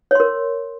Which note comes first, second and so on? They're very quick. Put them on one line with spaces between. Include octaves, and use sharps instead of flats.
C#5 C6 A#4